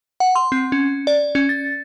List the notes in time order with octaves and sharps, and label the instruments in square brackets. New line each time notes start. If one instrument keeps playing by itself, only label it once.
[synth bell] F#5
C6
C4
C#4
D5
C#4
A6